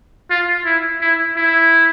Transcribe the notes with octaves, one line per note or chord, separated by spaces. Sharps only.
F4
E4
E4
E4